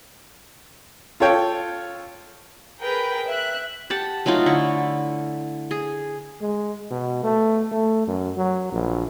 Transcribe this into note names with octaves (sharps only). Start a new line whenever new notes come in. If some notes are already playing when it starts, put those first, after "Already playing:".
F4 A4 C#5 G5
G#4 A#4 B4 G5
E5 F#6
G4 F#5 A5
F#3 A3 D#4 F4
D3 E4 C#6
G#4
G#3
B2
A3
A3
F#2
F#3
A#1